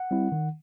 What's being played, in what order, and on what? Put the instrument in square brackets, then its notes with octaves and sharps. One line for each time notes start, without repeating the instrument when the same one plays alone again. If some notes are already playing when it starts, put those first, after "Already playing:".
Already playing: [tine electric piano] F#5
G3 C4 E4
D#3